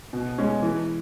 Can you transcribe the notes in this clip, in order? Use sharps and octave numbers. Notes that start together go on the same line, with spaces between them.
B2
G#3 C#4
E3